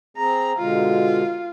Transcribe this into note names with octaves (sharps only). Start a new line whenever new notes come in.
C4 G#4 A#5
B2 D3 G#3 F4